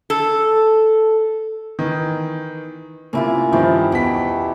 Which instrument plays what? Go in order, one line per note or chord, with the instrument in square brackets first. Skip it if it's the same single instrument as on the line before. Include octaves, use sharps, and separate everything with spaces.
[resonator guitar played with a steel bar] A4
[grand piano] D#3 E3
[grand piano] C3 A#3 [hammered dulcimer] C#4 E4 F4
[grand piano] G2 D#3 F3 [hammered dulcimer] E4 G4 C5
[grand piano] E2 B6 [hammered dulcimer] B2